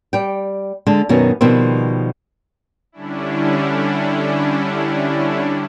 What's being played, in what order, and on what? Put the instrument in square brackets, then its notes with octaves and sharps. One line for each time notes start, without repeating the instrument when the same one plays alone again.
[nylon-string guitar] G3 G5
D3 G#3 A5
F#2 B2 D#3 C#4
B2 D#3 F3 G3 C4
[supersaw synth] D3 G3 C#4 D4 E4